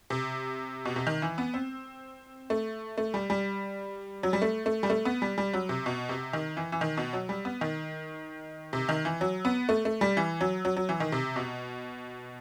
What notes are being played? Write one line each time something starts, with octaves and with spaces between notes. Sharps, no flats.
C3
B2
C3
D#3
E3
B3
C4
A3
A3
G3
G3
F#3
G3
A3
A3
G3
A3
B3
G3
G3
F#3
C3
B2
C3
D#3
E3
E3
D#3
B2
F#3
G3
B3
D#3
C3
D#3
E3
F#3
B3
A3
A3
G3
E3
F#3
F#3
F#3
E3
D#3
C3
B2